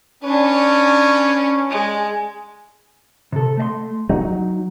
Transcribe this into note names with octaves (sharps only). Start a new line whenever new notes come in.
C#4 D4 B4
G#3
C3 A4
A3 D#5 C6
F#3 D#4